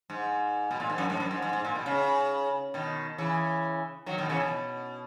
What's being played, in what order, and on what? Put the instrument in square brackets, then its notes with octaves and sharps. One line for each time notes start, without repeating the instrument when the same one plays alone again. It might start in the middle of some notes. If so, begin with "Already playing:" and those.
[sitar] G#2
B2
A#2
G#2
F#2
G#2
F#2
G#2
G#2
G#2
A#2
B2
C#3
B2 D#3
C#3 E3
D#3 F#3
B2 D#3
C#3 E3
B2